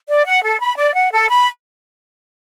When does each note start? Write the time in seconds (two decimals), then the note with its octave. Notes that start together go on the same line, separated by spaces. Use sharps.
0.08 D5
0.25 F#5
0.43 A4
0.59 B5
0.77 D5
0.94 F#5
1.12 A4
1.29 B5